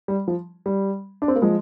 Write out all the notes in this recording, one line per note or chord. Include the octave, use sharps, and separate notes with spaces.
G3
F3
G3
D4
C4
A#3
F3 G#3